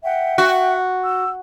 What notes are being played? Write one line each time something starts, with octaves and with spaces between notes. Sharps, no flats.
E5 F#5 G5
F#4
E6